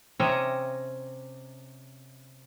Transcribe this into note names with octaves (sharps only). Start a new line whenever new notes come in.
C3 C#4 D#5 E5 A#5